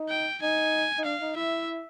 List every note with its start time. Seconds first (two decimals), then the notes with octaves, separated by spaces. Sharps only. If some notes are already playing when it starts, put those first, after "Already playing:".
Already playing: D#4
0.09 G5
0.42 D#4 G#5
0.98 D#4
1.05 D4 F5
1.21 D#4
1.36 E4 E5